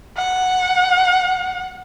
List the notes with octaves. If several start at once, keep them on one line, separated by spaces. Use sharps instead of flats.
F#5